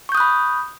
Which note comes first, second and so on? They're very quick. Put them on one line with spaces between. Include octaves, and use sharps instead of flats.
C#6 G6 D#6 F#6 B5